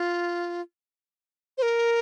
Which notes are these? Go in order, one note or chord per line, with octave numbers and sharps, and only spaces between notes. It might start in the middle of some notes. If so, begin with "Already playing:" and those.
Already playing: F4
C5
A#4